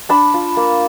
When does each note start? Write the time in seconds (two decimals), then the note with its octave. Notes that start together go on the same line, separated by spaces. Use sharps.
0.09 D4 A5 B5
0.34 F4
0.57 A#3